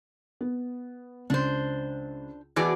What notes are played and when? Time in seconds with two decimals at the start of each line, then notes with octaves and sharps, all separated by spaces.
0.41 B3
1.30 C#2 D4 C5
2.56 B2 E3 G#4 D5 D6